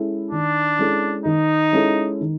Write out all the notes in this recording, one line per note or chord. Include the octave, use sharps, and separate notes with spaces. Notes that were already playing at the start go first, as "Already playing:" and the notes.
Already playing: G#3 C#4 E4 A4
D#3 D4
G#3 C#4 E4 A4
D#3 D#4
G#3 C#4 E4 A4
D#3